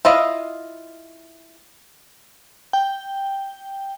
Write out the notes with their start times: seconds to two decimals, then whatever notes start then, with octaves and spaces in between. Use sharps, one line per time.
0.05 E4 F4 D#5 F5
2.73 G5